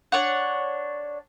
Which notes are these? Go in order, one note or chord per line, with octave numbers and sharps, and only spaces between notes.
D4 C#5 F#5